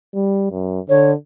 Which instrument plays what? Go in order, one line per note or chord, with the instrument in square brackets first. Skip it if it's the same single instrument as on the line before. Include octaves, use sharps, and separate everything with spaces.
[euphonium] G3
F#2
[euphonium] D3 [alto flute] C#5